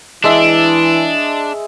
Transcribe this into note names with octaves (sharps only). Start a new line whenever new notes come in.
E3 G#3 D4 E5